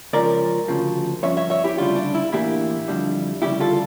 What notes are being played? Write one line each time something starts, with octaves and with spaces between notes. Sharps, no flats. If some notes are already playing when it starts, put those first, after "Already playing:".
C#2 C#3 F3 C#4 A#4 D5
D2 C#3 F3
G2 F3 C#4 C#5 E5
C#5 E5
C#5 E5
E4 G4
D2 C#3 G3 D4 F4
D4
E4
A2 E3 A#3 D4 E4 G4
F2 D3 G3 D4
D2 C#3 G3 E4 G4
F4 A4